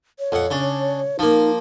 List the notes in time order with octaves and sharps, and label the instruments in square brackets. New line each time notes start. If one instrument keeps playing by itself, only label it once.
[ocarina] C#5
[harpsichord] F2 F#5
C#3 D4
[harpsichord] F3 A#3 [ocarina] D#4